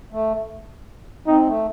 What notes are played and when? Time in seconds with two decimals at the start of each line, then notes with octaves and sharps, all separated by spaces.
0.12 A3
1.27 C4 D#4
1.46 A3